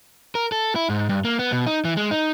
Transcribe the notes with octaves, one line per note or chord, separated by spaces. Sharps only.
A#4
A4
E4
G#2
G2
A#3
B3
B2
D#4
E3
G#3
D#4